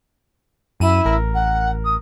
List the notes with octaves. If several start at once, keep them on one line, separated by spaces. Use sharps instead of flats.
F#2 E4 D#7 E7
A1 A#4
F#5
D#6